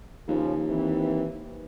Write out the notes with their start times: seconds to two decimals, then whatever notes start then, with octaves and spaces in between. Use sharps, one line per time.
0.28 D#2 C#3 F3
0.69 E3 C4